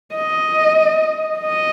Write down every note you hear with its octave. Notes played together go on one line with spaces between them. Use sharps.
D#5
D#5